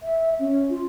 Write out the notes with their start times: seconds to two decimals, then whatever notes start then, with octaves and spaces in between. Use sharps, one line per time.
0.02 E5
0.39 C#4
0.70 F4